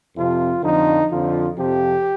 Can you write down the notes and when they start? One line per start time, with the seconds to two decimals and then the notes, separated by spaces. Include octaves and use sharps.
0.17 F2 C3 F3 F4
0.64 F2 D3 F3 D#4
1.11 F2 D3 F3 F4
1.57 F2 C3 F3 G4